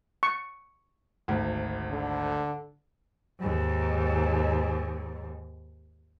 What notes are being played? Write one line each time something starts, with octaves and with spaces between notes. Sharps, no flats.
C#6
G#1 D2
D3
D#2 G#2